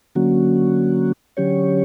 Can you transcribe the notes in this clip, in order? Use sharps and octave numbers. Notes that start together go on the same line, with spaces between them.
D3 F#3 A#3 C#4 F#4
D3 F#3 C#4 G4 C#5